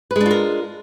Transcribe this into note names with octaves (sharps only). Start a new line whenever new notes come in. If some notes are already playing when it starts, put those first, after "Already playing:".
G#3 D4 F4 A#4 B4